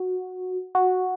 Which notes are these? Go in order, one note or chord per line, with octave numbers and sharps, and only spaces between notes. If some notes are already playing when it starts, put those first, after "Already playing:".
Already playing: F#4
F#4